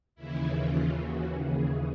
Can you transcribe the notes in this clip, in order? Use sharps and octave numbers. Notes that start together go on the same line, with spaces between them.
D#2 C#3 E3 E4
F4
F#4
G#4